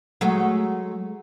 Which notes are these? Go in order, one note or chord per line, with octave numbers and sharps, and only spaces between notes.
F#3 G#3 A3